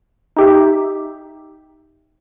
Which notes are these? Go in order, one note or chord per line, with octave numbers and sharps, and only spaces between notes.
D#4 G4 E5